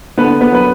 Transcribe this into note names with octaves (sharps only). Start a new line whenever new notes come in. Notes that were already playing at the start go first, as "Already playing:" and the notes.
D3 B3 B4
B3 B4
F#3 B4